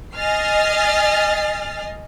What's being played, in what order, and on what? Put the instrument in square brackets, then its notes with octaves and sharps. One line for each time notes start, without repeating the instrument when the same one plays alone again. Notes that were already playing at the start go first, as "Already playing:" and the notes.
[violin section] D#5 G#5 F6 A6 C7